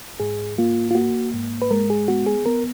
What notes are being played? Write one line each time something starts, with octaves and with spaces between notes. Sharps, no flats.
G#2 G#4
A#3 F4
F4
A#3 F#4
G#2
B4
G#3 A#4
G#4
B3 F#4
G#4
B3 A#4